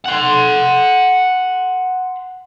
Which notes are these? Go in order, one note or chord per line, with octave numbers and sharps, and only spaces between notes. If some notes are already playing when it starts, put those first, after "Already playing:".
F#5 C6